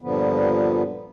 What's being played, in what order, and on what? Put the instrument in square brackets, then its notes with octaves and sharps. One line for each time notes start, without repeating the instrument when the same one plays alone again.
[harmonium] G2 A#2 D3 F3 B3